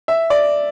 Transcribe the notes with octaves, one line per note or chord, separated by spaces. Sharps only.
E5
D5